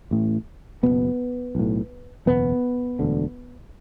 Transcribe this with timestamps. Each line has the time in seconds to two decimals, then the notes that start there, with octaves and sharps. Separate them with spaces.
0.11 A1 A2
0.83 F#1 E2 B2 B3
1.55 B1 A2
2.26 F#1 E2 B2 B3
2.99 E1 D2 D3